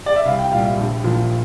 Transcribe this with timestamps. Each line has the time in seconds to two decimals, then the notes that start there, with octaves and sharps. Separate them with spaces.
0.06 D5
0.16 E5
0.25 C2 F5
0.39 G5
0.52 A#2 F5
0.54 G3
0.64 E5
0.77 A#1
1.04 A#2 F3